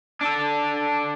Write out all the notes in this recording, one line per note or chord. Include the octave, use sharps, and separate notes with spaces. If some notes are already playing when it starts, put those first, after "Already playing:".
D4 A4